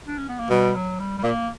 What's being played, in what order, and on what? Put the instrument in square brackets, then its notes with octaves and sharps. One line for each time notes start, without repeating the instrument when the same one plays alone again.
[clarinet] D4
C#4
B3
A#3
[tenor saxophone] B2 [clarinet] G3
[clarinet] F#3
G3
G3
[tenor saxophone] A#2 [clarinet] A#3